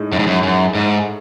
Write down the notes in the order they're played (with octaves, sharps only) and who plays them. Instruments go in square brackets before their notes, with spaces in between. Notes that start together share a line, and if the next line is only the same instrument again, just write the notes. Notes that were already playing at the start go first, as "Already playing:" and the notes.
Already playing: [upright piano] A2 G#3 D#4
[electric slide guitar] F#2
G#2
F#2
F#2
G#2